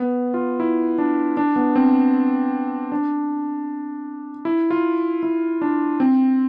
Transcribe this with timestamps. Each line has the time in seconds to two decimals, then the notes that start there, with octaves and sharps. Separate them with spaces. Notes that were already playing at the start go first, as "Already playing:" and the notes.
Already playing: B3
0.34 F4
0.60 E4
0.98 D4
1.37 D4
1.56 B3
1.76 C4
2.92 D4
4.45 E4
4.70 F4
5.23 E4
5.62 D4
6.00 C4